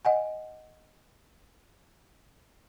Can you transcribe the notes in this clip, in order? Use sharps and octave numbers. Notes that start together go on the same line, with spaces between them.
D#5 F#5 G#5